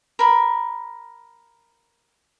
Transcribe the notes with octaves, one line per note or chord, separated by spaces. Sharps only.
A#4 B5